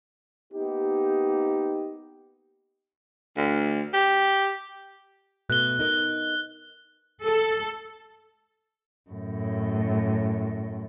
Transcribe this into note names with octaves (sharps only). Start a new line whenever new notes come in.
A#3 B3 D#4 G4
D2
G4
B2 A3 F#6 G7
D#4 A#4 D#5
A4
F#2 A2